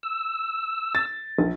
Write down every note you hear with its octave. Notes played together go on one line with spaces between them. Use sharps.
E6
A6
A#1